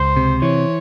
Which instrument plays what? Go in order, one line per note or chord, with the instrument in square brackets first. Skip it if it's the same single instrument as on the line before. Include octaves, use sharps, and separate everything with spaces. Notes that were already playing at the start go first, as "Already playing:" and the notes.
Already playing: [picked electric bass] C#2 [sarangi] C5
[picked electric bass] C3
[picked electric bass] E3 [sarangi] C#5